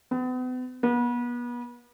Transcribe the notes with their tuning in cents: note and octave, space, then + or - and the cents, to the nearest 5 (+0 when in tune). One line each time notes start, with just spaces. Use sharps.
B3 +40
B3 -35